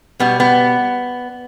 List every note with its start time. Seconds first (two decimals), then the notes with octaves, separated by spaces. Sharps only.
0.20 B2 G3 B3
0.40 B3